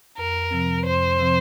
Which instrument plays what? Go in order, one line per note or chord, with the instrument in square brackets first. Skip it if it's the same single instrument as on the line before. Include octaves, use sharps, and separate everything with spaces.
[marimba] F2 [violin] A#4
[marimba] C3 F3 C4
[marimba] F2 [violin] C5
[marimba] C3 F3 C4